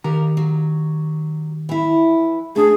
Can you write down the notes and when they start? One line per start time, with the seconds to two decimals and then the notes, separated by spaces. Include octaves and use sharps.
0.04 D#3 G4 A#4 A#5
0.37 F#3
1.69 E3 E4
2.56 A3 D4 G#4 A4